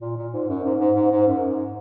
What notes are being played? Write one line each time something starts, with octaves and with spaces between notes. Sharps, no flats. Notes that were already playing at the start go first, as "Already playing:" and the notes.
A#2
A#2
G#2
F#2
G#2
G#2
G#2
G#2
F#2
G#2